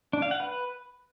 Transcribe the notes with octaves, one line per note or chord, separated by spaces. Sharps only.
D4
F5
F#5
B4